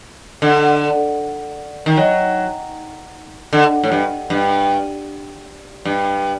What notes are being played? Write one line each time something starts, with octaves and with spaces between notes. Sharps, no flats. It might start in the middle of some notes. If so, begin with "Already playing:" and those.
D3
D#3
F#3
D3
A2
G2
G2
G2